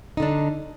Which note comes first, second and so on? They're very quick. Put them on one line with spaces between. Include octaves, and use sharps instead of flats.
D#4 D3 D4